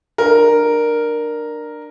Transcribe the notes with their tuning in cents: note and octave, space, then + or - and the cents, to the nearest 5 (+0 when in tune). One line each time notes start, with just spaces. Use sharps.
D4 +25 A#4 +0